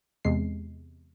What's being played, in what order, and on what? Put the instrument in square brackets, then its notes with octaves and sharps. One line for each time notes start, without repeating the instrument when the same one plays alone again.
[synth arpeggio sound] E2 C3 G#3 C7